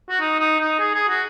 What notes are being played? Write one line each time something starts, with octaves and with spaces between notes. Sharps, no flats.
F#4
D#4
D#4
D#4
G#4
G#4
F#4